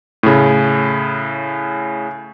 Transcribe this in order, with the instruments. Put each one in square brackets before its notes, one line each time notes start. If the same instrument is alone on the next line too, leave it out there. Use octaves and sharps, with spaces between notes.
[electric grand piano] A2 C#3